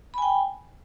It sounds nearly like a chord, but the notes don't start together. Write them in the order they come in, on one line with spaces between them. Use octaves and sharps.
B5 G#5 G5